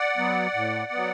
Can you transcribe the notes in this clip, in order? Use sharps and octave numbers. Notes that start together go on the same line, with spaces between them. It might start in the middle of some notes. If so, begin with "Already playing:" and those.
Already playing: D5 F#5
F#3 B3
A2
F#3 B3